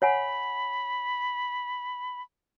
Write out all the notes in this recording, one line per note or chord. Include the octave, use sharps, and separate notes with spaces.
C#5 F#5 G#5 B5